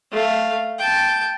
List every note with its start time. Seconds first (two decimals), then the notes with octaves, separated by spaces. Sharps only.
0.11 A3 F5
0.78 G5 A5